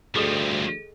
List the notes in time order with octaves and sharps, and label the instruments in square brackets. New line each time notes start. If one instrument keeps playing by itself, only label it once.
[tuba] D2 [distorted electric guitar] G2 F3 [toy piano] G#4 A4 D#5